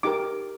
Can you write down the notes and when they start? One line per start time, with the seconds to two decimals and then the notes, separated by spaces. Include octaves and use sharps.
0.03 D#4 G4 A#4 D6